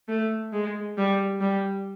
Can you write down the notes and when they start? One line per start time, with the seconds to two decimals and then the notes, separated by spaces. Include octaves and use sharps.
0.08 A3
0.52 G#3
0.97 G3
1.41 G3